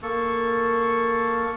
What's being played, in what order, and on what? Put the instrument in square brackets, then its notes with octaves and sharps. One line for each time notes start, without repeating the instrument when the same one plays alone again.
[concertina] A#3 A4 C#6